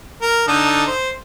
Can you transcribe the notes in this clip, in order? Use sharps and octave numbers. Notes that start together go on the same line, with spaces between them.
A#4
D3 D#4 A4
C5